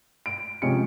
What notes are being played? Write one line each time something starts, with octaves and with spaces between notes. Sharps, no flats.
D7
C3 F3 G#3 C#4 C#7